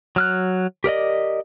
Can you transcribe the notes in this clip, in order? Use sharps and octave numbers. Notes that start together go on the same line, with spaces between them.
F#3 F6 F#6
G4 A#4 D5 D#5